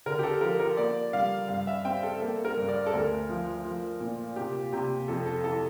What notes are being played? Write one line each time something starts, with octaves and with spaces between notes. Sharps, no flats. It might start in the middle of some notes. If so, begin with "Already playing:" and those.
D3 A#4
G4
A4
F3 A#4
A#4
A#3 D5
G3 F5
G2 F5
E5
C4 G5
A4
A#3 A4
A#4
G2
D5
A4
D2 A#4
F3
F3
A#2
C3 G4
C3 G4
F2 A4
A4
E3 A4